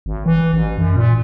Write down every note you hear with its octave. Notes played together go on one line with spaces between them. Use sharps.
G#1
E3
A1
F#2
A#2